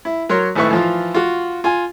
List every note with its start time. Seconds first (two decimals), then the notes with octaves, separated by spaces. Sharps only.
0.05 E4
0.29 F#3 A#4 C#5 C6
0.56 G#1 A2 A3 B4 E5 C#6
0.71 E3 F3 F4
1.14 F4 F#4
1.64 F4 G#5